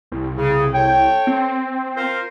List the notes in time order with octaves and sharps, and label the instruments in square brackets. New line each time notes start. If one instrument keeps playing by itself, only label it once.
[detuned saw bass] C2
[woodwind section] C#3
A4 C#5 G5
[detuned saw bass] C4
[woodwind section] F4 A#4 C5